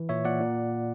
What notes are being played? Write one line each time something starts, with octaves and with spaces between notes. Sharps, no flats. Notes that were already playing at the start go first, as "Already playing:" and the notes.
Already playing: E3
A#2 C#5 E5
A#2 D5 F#5
A#2